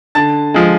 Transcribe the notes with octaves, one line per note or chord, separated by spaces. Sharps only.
D3 A5 A6
F3 G#3